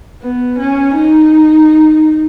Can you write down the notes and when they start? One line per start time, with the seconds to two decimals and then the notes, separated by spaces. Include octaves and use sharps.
0.22 B3
0.59 C#4
0.95 D#4